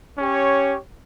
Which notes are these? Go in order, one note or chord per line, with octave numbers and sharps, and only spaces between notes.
C#4 G4 C#5